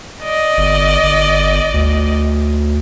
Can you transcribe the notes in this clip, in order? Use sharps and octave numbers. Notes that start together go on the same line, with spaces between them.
D5 D#5
G1
G1
D2